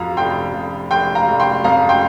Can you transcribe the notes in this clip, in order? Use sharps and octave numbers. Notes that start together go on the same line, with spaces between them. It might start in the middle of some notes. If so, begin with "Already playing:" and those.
Already playing: F2 F3 F5 A#5
F1 G5 C6
F1
F1 G5 C6
F5 A#5
F1
G5 C6
F2 F5 A#5
G5 C6